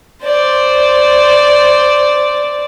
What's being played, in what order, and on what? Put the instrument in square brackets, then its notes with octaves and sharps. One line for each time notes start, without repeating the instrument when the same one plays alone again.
[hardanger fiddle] C5 D5